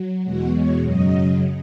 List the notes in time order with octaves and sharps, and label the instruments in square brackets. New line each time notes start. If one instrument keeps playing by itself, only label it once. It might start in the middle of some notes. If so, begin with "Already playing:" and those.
Already playing: [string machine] F#3
E2 B2 G#3 F#4
C#5
F#2 C#3 F#3 D#5